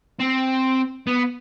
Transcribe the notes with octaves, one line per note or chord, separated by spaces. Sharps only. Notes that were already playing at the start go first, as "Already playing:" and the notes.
C4
B3